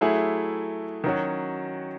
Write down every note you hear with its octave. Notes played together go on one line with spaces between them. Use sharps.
F#3 A3 E4 G#4
D#3 F#3 C#4 F#4